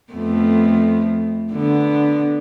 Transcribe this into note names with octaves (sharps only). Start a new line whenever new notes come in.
F2 A3 B3
D3 B3